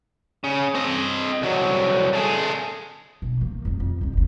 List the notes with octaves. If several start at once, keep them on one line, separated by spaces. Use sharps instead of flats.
C#3
C4 D#5
C2 F#3
A3 G#4
B1
D#3 A#3
F2 C3
F2
C2 D#3
F#1 D#2